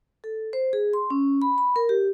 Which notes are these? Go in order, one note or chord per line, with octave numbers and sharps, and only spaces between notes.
A4
C5
G#4
C6
C#4
B5
B5
A#4
G4